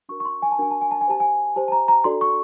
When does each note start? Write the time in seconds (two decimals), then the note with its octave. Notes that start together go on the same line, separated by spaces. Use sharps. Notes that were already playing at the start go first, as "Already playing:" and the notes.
0.09 D4 F#4 A#4 C#6
0.20 C#6
0.25 C6
0.42 G#5
0.52 A5
0.58 D4 F#4 A#4 G#5
0.71 A5
0.81 G#5
0.91 A5
1.01 G#5
1.07 G4 C5 A5
1.20 G#5
1.56 G4 C5 A5
1.68 A5
1.72 A#5
1.88 A#5
2.04 D4 F#4 A4 D5 C6
2.21 C#6